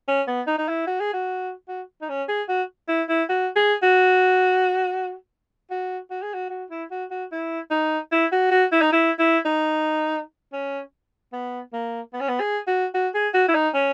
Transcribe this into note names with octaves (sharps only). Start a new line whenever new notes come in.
C#4
B3
D#4
D#4
E4
F#4
G#4
F#4
F#4
D#4
C#4
G#4
F#4
E4
E4
F#4
G#4
F#4
F#4
F#4
G#4
F#4
F#4
E4
F#4
F#4
E4
D#4
E4
F#4
F#4
E4
D#4
E4
E4
D#4
C#4
B3
A#3
B3
C#4
B3
G#4
F#4
F#4
G#4
F#4
E4
D#4
C#4